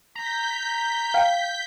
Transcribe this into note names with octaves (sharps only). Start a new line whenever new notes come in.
A#5 G6 B6
F5 G5